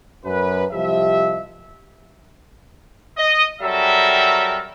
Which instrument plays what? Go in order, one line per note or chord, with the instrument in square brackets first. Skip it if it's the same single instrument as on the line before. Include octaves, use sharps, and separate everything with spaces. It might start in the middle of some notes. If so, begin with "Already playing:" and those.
[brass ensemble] F#2 B4
C2 F3 G4 D#5 E5
D#5
F#3 G3 C4 A4 A#4 E5